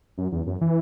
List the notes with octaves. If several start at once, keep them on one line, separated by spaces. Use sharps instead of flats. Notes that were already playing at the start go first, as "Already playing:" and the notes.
F#2
E2
F#2
E3